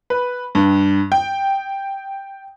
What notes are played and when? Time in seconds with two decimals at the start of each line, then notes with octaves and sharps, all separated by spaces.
0.10 B4
0.55 G2
1.12 G5